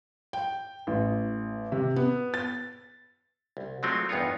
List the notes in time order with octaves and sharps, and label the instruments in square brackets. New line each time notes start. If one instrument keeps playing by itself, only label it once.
[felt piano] G5
A1
C3
B3
A6
[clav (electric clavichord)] C2
F#3 G#3 A3 C4 F4 F#4
E2 G2 B3 D#4 F4 C#5